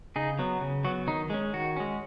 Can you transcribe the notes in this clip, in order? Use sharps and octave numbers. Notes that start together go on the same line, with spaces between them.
C#3 D#4 G#4
F#3 B3
C#3
F#3 B3 F#4
D#3 D#4
G#3 C#4
D#3 F#4
G#3 C#4